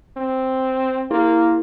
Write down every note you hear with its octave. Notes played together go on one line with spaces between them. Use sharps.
C4
A#3 E4